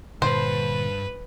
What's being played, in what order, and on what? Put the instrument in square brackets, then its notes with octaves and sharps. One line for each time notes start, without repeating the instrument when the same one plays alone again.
[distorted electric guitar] G2 [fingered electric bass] A#2 D3 [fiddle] B4 [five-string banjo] C5